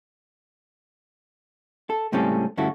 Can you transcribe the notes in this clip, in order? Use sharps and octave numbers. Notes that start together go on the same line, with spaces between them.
A4
C#2 A2 G3 C4 C#4 A4
D2 G2 C#4 E4 F#4 A4